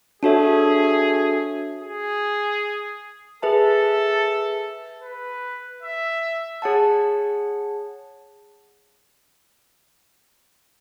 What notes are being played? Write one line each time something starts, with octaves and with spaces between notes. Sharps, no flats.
D4 F#4 G#4 A4 C#5 E5
G#4
G#4 A4 B4 E5 A5
B4
E5
G#4 C#5 F#5 A5